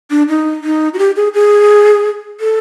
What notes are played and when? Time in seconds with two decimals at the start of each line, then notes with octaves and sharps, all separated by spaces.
0.10 D4
0.29 D#4
0.64 D#4
0.94 F#4
0.99 G4
1.16 G#4
1.34 G#4
2.40 A4